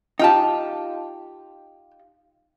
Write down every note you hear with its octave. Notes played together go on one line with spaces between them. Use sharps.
D#4 F4 G4 G5 A5